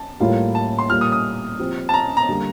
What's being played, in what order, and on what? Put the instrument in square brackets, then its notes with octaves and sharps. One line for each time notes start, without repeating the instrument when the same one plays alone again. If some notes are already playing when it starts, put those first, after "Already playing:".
Already playing: [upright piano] A5
[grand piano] A2 G3 A#3 F4
[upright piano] A5
C6
[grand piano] A#2 G3 A#3 F4 [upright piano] F6
[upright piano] D#6
D#6
[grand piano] F3 C4 G4
[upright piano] A5
A#5
A#5
[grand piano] D3 G3 A#3